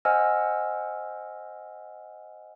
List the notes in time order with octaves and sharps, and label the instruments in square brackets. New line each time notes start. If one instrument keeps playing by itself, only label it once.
[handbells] C5 D#5 F#5 G#5 E6 F6